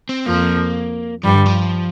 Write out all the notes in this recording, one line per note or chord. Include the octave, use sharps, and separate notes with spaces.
C4
F2 F3 A#3
G2 F3 G3
D3
F3